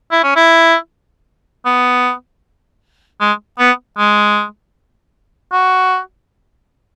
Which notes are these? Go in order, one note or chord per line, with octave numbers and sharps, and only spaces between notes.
E4
C#4
E4
B3
G#3
B3
G#3
F#4